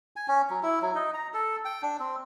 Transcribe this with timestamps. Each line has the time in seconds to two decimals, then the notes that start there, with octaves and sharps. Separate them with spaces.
0.16 G#5
0.28 C#4
0.50 F#3
0.63 E4
0.82 F#3
0.95 D#4
1.14 A#5
1.34 A4
1.65 G5
1.82 D4
1.99 C4